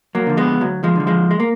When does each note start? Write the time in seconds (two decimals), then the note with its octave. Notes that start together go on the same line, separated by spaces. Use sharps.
0.15 F#3 A#3
0.27 D3 F3
0.37 G#3 B3
0.61 D2 F#3
0.84 F3 G#3
0.96 D3 F3
1.07 F3 G#3
1.31 G#3
1.40 A#3